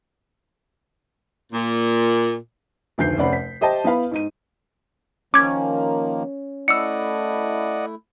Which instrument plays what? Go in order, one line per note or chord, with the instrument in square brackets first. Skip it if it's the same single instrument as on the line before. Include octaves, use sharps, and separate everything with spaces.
[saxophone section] A#2
[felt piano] F1 D2 D#3 G6 C7
F1 C3 C#4 D5 F#5 B5
B6
G4 C5 D#5 E5 G5 A5
B3 E4 B4 F5 B5
G#2 D#4 D#7
[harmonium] D#3 F3 A#3 [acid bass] C#4 [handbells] D6 G#6
[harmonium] A3 E4 [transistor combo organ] D5 D#5 F#5 [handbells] E6 C#7